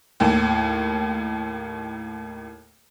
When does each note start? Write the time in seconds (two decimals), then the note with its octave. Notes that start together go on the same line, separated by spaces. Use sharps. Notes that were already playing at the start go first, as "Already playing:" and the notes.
0.20 D#2 A2